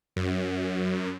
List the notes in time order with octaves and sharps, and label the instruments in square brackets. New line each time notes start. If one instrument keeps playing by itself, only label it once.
[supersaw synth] F#2